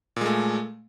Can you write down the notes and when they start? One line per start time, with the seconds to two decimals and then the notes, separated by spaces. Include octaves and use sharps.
0.16 A#2
0.21 G#3
0.26 A3